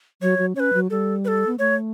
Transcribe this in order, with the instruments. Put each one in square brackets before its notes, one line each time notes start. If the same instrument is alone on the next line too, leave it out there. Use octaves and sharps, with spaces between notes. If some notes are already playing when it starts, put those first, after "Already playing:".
[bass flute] F#3 [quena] C#5
[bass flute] F#3
[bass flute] C#4 [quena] C#5
[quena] B4
[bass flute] F#3
[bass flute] G3 [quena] A4
[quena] B4
A4
[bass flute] B3
[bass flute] A3 [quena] C#5